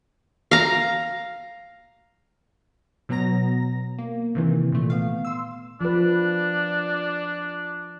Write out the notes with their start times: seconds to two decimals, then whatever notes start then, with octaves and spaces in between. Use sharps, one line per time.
0.51 F5 A#5
3.09 B2 F#3 B3 A#5 A#6
3.98 A#3
4.35 C3 D#3 E3
4.72 A#2 A3
4.90 B3 F5
5.25 C6 E6
5.81 F3 D4 B4